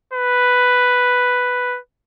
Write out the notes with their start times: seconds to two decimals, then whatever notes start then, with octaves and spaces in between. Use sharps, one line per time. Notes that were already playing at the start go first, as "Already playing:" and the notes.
0.13 B4